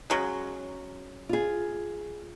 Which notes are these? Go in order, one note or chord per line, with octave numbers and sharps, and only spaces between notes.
C#3 F#3 G#3
F4 G#4